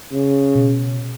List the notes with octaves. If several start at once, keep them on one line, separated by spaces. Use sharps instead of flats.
C#3
B2